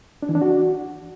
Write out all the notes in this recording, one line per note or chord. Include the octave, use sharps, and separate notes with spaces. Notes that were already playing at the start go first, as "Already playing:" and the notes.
D4
E3
D4
F#4